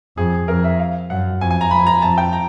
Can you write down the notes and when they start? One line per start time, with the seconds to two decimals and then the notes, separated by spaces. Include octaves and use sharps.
0.17 F2 G#4
0.48 F2 A#4
0.64 E5
0.79 F5
1.10 F#2 F#5
1.41 F2 G#5
1.51 G#5
1.61 A#5
1.71 F2 B5
1.87 A#5
2.02 F2 A5
2.18 G5
2.33 A#5